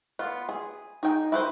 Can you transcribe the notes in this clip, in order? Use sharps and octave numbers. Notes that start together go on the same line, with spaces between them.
B3 F4
G#4
D#4 G#4 G5
E4 B4 C5